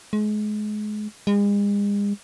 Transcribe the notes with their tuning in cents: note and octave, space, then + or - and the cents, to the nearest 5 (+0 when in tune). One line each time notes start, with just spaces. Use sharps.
G#3 +30
G#3 -40